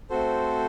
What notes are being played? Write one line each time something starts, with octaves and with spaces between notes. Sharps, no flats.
A3 C4 F#4 A4 C5